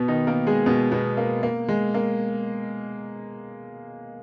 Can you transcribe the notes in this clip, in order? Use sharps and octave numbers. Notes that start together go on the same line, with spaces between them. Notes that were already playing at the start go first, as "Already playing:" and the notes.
Already playing: B2 B3
D#3 D#4
A#3 A#4
G#3 G#4
B2 B3
B2 B3
A#3
A#3
G#3
A#3